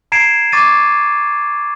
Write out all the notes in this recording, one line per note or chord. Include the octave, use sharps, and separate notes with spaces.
A#5 G#6 C7 D7 E7
C#6 D6 A6 D#7